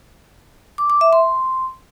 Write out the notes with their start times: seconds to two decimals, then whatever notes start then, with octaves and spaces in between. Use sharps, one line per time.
0.78 D6
0.90 D6
1.01 E5
1.13 C6